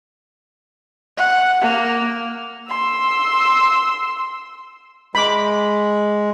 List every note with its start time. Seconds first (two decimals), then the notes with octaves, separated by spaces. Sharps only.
1.17 F#5
1.61 A#3
2.69 C6 E6
5.15 G#3 B5 D6